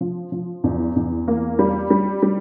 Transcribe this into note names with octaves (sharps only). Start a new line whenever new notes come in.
F3
F3
E2
E2
A#3
G3
G3
G3